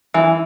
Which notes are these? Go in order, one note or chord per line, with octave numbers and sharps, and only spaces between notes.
E3